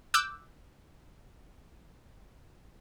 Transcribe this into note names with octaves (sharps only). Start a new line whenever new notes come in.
D6 E6 F#6 G6